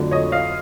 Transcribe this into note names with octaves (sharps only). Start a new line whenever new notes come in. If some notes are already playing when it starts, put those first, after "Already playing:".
Already playing: F2 D3 F#3 A3
C#5 D#5
D#5 F5